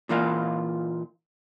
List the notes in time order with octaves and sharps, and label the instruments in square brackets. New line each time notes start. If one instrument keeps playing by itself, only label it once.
[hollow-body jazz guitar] A#2 E3 A#3 F4